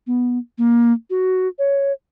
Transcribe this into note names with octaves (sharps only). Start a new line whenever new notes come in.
B3
A#3
F#4
C#5